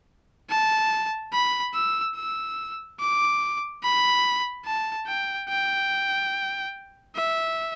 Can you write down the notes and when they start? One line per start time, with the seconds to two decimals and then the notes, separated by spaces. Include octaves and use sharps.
0.50 A5
1.33 B5
1.74 E6
2.16 E6
3.00 D6
3.83 B5
4.65 A5
5.07 G5
5.49 G5
7.15 E5